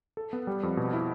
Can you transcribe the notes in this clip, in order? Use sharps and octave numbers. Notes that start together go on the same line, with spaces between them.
A4
B3
G3
F2
B2
E4